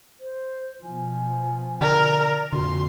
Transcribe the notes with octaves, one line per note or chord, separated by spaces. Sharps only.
C5
B2 F3 G#5
D3 A#4 D5
F2 A#2 D3 F#4 C6